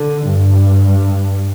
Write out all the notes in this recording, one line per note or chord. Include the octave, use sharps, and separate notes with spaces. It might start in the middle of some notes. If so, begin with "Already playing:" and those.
Already playing: D3
G2